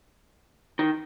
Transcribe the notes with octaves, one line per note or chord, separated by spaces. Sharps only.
D#3